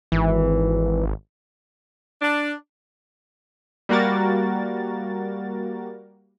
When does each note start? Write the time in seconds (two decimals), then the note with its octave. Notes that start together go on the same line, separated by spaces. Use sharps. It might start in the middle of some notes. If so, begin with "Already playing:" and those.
0.12 G#1 E3
2.22 D4
3.89 G3 A#3 F#4 A#4 A6